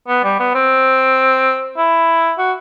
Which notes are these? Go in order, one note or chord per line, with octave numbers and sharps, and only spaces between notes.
B3
G3
B3
C4
E4
F#4